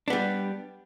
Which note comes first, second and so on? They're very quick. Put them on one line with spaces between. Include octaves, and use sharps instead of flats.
D4 B3 G3